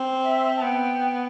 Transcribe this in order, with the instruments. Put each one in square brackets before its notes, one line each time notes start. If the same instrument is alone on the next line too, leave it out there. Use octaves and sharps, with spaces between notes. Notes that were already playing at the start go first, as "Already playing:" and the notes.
Already playing: [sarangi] C4
[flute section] E5
A5
[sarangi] B3 [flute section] G5